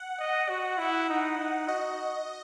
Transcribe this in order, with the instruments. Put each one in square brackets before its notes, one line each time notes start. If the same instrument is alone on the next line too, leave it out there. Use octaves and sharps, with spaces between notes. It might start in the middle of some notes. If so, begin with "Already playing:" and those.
Already playing: [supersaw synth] F#5
[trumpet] D#5
F#4
[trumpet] E4 [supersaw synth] F#5
[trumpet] D#4
D#4
[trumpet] F#4 [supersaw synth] D#5